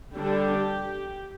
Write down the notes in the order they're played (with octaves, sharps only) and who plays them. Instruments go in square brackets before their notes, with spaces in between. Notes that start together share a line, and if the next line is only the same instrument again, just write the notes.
[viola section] D3 G3 D4 G4